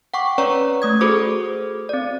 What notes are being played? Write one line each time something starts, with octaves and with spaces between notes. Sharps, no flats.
F#5 G5 C#6 D6
C#4 B4 C#5 D5 A#5 C#6
A3 D#6 G#6
F#4 G#4 A4 C5 D6
C4 D5